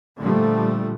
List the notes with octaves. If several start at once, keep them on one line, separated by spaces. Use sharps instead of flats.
A#2 D3 F3 G3 A3